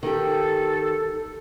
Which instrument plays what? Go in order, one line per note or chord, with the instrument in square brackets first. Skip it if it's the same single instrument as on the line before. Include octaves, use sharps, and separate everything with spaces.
[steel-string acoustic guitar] D#3 G4 [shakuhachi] A4